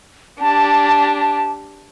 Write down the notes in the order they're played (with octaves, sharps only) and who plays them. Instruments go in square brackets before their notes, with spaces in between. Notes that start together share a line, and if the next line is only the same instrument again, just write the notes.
[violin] D4 G4 [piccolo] A5